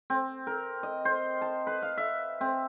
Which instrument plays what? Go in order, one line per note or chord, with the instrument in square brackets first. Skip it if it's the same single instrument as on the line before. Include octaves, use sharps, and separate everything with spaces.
[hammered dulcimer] C4
A#4
D#5
C5
A5
B4
F5
E5
C4